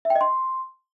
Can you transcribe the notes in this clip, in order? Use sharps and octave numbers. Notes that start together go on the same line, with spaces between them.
E5
G5
D#5
C6